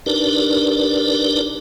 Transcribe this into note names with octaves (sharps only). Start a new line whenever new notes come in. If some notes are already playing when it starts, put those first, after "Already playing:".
D4 D#4 G4 A#4 B4 D5